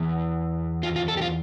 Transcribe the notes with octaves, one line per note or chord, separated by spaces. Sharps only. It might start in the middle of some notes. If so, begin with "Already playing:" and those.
Already playing: E2 E3
F4
F4
A4
G4
F4